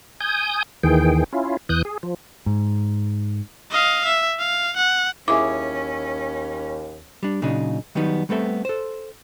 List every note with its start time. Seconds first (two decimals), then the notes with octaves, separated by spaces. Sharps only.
0.20 G#5 D#6 G6
0.83 D#2 D#3 E3 G#4 G5
1.33 C#4 E4 F4
1.69 E2 E3 D#6 F#6 G6
1.85 G#4
2.03 F3
2.46 G#2
3.70 D#5 F5
4.05 E5
4.39 F5
4.77 F#5
5.28 D#2 C#4 E4 G#4 E5 D6
7.23 G3 D4
7.42 A#2 C#3 F#3 D4 D#4
7.95 D#3 F#3 G3 B3 D#4
8.29 G3 A3 B3 C4 A4 E5
8.65 A4 C5